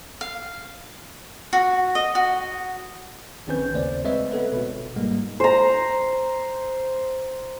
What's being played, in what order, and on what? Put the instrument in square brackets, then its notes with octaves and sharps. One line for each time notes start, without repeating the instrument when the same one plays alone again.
[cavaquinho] F5
F#4
D#5
F#4
[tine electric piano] A#1 D#3 C4 C#4 B4 G6
D#2 C#3 A3 C5 D5
G#3 C4 B4 C#5 D#5 E5
B3 A4 B4
G1 B2
G#2 G3 G#3 A#3
[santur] C5 A#5